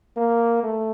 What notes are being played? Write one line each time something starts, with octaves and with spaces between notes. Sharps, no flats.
A#3
A3